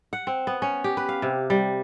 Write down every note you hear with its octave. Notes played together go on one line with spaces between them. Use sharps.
F#5
C4
B3
C#4
G4
B4
F5
C3
G3